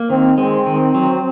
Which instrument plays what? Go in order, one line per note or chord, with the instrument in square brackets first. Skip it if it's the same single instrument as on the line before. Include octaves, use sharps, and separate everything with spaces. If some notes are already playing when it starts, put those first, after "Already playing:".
Already playing: [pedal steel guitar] A#3
[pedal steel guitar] D#3 [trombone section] C4
[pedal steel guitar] G#3 [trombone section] C4
[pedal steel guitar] D#3
F#3